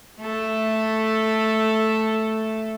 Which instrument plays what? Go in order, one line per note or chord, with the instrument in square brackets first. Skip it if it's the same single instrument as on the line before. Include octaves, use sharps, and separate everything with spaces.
[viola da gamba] A3 A4